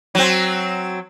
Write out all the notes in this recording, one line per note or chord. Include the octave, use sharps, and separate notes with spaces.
F#3 C4